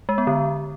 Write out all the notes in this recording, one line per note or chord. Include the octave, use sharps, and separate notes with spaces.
G#3
B3
D3